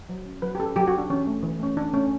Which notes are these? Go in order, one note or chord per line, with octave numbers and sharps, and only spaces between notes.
F#3
C#4
F#3 B4
G4
C#4 A4
F#3 G4
F#4
C#4
D4
E3 C#4
A3 C#4
E3
A3 C#4
E3 D4
A3 C#4